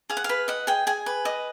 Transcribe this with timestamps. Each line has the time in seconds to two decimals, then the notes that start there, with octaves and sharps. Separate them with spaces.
0.10 G#4 F5
0.17 F#5
0.24 F5
0.29 B4
0.48 D#5 F#5
0.67 G#4 G5
0.87 G#4 G#5
1.06 B4
1.25 D#5